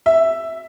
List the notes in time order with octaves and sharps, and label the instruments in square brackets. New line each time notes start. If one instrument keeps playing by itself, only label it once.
[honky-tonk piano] E5